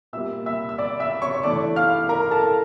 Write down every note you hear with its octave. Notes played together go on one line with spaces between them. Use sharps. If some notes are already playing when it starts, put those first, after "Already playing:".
A#2 G3 A#3 E5 E6
E5 E6
E6
D5 D6
E5 E6
C#5 C#6
E3 A3 D4 D5 D6
F5 F6
A#4 A#5
A4 A5